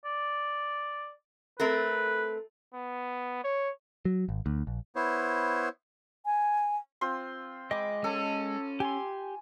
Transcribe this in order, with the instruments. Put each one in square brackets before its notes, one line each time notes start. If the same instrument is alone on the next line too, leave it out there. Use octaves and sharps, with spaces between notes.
[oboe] D5
[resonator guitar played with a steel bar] A3 C4 A#4 [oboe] B4
[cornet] B3
C#5
[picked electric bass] F#3
G#1
D2
A#1
[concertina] B3 E4 C5 C#5
[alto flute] G#5
[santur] C4 F4 C6
[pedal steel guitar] G#3 D#5 G5 [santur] B5 D6
[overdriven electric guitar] C#4 [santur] A4
[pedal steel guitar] G4 C6 [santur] G#5